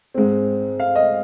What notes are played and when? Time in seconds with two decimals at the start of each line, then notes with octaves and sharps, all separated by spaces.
0.14 G#2 G#3 C4
0.80 F5
0.95 D#5